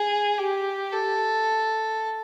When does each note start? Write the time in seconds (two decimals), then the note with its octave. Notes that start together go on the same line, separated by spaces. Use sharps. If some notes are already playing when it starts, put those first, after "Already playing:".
Already playing: G#4
0.38 G4
0.93 A4